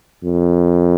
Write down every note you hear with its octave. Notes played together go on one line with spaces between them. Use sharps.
F2